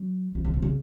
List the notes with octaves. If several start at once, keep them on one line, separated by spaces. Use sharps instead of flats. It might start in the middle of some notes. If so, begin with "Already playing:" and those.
Already playing: F#3
F3
C#3
C3
C#3